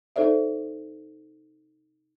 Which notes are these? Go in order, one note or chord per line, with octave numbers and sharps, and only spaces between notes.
D#4 A4 C5 D5 E5